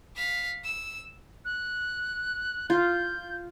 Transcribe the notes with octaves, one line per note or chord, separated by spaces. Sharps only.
F5 B6
E6
F#6
F4 G6